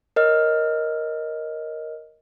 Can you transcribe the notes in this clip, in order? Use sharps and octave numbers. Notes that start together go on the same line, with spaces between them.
A#4 C#5 D#5 F6